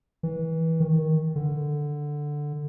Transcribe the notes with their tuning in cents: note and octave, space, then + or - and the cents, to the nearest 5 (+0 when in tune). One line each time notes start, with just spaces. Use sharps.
E3 -25
D#3 +15
D3 +5